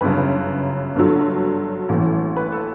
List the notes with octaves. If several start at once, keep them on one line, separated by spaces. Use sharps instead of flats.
G1 F#2 C#3 B4
G1 G2 D3 F#3
A1 A2 E3
B4
A4